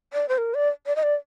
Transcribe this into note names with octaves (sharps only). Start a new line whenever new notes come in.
D5
C5
A#4
D5
D5
D#5
D5